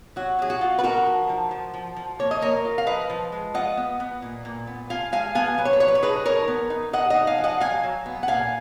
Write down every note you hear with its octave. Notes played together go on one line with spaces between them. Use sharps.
F#3 F#4
F#3 G#4
F#4
F4
B4
D#4 F#4 A#4
F3
F3
F3
F3
F3
A#3 C#5
D#5
A#3 A#4 C#5
F4
F5
F3 B4 D#5
F3
G#3
F4 D#5 F#5
B3
B3
A#2
A#2
B3
F4 F5 G#5
G#3 F5 G#5
B3 F5 G#5
F#3 B4
C#5
B4
F#3 C#5
B4
C#5
D#4 G#4 B4
F3 A#4 C#5
B3
D#4
D#4 D#5 F#5
D#5 F#5
D#4
F5 G#5
F3
D#5 F#5
F#3 F5 G#5
F#3
B3
F#5
A#2 F5 G#5